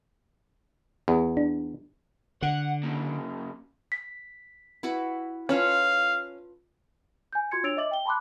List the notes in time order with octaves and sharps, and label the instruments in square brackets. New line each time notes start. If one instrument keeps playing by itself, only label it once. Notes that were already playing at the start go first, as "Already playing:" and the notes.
[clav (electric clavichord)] E2
[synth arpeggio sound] D4
[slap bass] D3 [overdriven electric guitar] F#5
[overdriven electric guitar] C#3 A#3
[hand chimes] B6
[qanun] E4 F#4 B4
[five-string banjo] C#4 [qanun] F4 A4 B4 [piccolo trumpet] F5
[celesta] G#5 G6
F4 F#4 C6 G#6 C#7
D4 C#5 E6 A6 D7 F7
D#5 E5 D6 A6 F#7
G5 G7
A5 B5 C6 D6 F#6